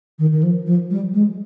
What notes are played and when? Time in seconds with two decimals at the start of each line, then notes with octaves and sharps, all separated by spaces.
0.19 D#3
0.32 D#3
0.43 F3
0.66 F3
0.91 G3
1.14 G#3